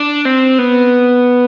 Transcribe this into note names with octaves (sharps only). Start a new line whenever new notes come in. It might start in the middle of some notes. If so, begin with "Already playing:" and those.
Already playing: D4
C4
B3